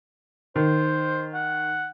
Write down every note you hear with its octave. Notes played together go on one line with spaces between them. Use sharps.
D#3 C5
F#5